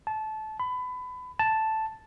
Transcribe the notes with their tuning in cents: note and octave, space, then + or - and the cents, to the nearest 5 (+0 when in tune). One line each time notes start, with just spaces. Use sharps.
A5 -20
B5 +25
A5 +0